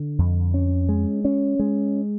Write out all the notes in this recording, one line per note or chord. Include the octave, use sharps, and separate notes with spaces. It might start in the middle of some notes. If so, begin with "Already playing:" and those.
Already playing: D3
F2
C#4
G#3
C#4
G#3